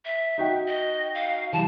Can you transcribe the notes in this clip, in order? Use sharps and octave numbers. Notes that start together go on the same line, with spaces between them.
E5
D#4 F#4 G5
D#5
F5
E3 G3 A5